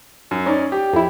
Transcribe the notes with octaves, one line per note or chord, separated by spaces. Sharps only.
F#2
C#4 D#4 D5
G4
F2 E4